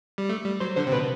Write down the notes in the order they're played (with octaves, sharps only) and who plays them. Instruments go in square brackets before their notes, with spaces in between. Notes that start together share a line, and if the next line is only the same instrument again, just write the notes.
[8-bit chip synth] G3
A3
G3
[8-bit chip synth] F#3 [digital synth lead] C5
[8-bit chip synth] D3 [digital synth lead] C5
[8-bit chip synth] C3
[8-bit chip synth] B2 [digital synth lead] B4